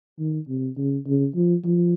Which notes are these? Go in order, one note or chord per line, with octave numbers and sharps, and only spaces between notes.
D#3
C3
C#3
C#3
F3
F3